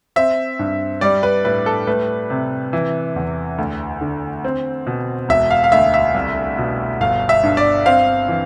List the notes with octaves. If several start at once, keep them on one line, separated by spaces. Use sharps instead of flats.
C4 E5
G2
G3 D5
B4
A2 B4
A4
A3 B4
C3
E3
E2
D2
D3
C4
B2
E1 E5
F5
F5
D2 E5
E5
C2
B2
G1 F5
E5
G2
D5
C4 F5
E3